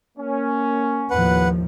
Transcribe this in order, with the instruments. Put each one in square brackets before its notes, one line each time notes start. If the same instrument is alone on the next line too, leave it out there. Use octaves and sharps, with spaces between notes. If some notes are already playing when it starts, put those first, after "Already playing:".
[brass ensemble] A#3 C#4
[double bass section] D#2 A2 F3 [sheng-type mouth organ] B4 F#5